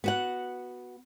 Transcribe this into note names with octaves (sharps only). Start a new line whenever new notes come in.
B3 F#4 F#5